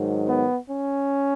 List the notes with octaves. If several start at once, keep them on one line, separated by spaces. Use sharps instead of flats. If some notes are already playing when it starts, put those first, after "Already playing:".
Already playing: G#2 D#3 F#3
B3
C#4